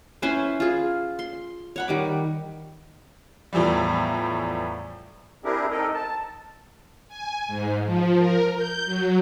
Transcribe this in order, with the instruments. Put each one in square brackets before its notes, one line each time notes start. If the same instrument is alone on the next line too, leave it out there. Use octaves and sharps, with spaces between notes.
[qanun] C#4 E4 B4 C5
F4 G#4
C6
C#5 F#5 B5
D#3 G3 D6
[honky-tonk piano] E2 A2 E3 F3 G3
[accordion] C4 D4 E4 G4 G#4 A#4
C4 D#4 A4 A#4 D#5
A5
[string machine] G#5
G#2
F3
A#4
G6
F#3